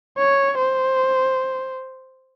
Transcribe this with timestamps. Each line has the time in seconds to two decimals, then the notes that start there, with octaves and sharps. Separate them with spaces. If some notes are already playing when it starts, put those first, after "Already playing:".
0.18 C#5
0.59 C5